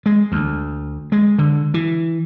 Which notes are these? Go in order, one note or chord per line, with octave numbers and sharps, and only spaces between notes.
G#3
D2
G#3
D3
E3